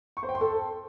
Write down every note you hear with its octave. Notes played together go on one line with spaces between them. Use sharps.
C#6
C5
G5
C6
A4